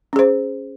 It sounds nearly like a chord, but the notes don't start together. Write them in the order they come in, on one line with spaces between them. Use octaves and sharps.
C#4 G#4 C5